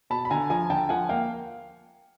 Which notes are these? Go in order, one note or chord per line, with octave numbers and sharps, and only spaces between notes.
B2 A5 B5
B5
D3 G#5 A#5
F3 G#5 A#5
D3 G5 A5
F3 F#5 G#5
A#3 F5 G5